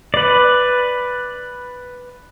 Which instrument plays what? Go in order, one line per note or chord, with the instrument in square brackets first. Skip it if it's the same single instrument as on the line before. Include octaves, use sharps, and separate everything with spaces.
[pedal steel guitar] B4 D5